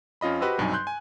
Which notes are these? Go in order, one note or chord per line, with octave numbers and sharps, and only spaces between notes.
F2 C#4 F4 D#5 B5
F#4 G4 B4 C5 D#5 E6
B1 G2 C3 F#3 D#4 G#5
C6 F#6 G6
G#5